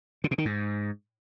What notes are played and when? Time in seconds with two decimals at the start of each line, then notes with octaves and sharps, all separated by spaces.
0.24 D3
0.31 B2
0.38 D#3
0.45 G#2